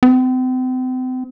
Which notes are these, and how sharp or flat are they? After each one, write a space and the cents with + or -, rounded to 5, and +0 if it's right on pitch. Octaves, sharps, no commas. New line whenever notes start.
C4 -40